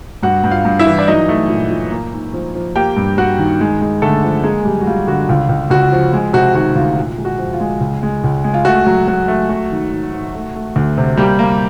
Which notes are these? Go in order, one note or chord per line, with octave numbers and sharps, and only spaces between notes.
G2 F#4 F#5
G2
F4 F5
G2
E4 E5
E3
D5
F#3 D#4 D#5
A3
A#2
A#2
A#3
G#2
F3
F3
A#3 G4 G5
G2
G2 F#4 F#5
D#3
G#3
G#3
D3 A3 A4
F3
G#3 A#3 G#4
F#2 G3 G4
F#4
G3 F4
D3 F#4
C#2 F4
C#2
C#2 F#4
F3
G#3
C3 F#4
D#3 F#4
D2 F4
A#2
G#3
F#4
F3
F4
G#3
C#2
G#3
C#2
G#3
F4
A3 F#4
F#3
F#3 F#4
A3
F#3 F#4
D#3
G#2
G#2
A3
A3
D2
C3
G3 A#3 G4
A#3